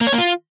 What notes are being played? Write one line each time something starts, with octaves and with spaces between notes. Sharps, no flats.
A#3
C#5
A#3
F4